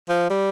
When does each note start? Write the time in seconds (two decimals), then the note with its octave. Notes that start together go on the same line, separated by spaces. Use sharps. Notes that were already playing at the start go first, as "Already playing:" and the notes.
0.09 F3
0.30 G3